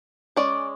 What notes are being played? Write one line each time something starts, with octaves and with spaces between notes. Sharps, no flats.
G#3 C#4 D5